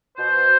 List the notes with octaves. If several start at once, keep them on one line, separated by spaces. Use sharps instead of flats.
B2 C5